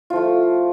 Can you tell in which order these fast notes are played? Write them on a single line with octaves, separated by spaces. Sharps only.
F4 F3 A3